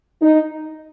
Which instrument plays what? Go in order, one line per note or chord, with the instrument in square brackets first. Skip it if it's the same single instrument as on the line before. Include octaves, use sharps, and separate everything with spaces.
[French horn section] D#4